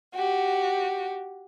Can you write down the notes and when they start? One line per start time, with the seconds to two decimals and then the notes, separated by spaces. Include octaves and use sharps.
0.14 F#4 G4